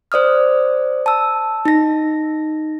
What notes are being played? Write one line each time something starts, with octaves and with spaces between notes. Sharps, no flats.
C5 D5 D#6 F6
A5 E6
D#4 A#6